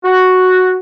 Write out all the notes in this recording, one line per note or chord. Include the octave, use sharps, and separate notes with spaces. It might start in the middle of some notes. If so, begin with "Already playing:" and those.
F#4